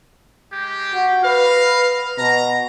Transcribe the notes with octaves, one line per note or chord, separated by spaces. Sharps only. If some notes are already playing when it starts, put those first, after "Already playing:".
G#3 G4
F#4
B4 D#5 F5
B2 A#5